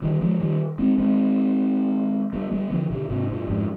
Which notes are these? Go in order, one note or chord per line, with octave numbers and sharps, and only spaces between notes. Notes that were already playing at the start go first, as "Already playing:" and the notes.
D#3 G3
F3 G#3
D#3 G3
G#3 C4
G#3 C4
G3 B3
G3 B3
D3 F3
B2 D3
G#2 C3
G2 B2
F2 G#2